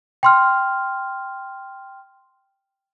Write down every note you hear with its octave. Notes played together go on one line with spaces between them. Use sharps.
G5 C6 F6